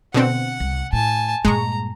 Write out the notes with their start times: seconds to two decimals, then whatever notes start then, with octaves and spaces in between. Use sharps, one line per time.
0.14 B2 D3 C4 F#5
0.60 C2
0.93 A2 G#5 A5
1.45 G2 A#2 G#3 A#5 C#6